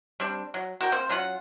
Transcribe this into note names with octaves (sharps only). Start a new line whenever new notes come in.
G3 C4 D4
F#3
F#4 A#4 G5
A#3 C4 C5
F#3 C#4 F4 F#5